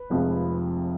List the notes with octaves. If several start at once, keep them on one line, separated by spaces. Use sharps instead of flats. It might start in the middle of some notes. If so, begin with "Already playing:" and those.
Already playing: B4
F1 F2 C3 F3 G#3